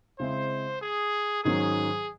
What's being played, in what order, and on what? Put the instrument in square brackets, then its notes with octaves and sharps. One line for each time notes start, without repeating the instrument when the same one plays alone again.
[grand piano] C#3 G#3 C4 E4 [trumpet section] C5
[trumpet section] G#4
[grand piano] G#2 D#3 F#3 C#4 [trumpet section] G#4